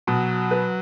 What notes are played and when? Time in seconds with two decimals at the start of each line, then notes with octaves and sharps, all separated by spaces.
0.07 B2 F#3
0.51 B4